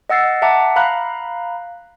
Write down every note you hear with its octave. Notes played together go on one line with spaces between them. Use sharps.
D#5 F#5 E6 A6 C7
E5 F#5 A5 A#5 D6
F5 A#5 B5 F#6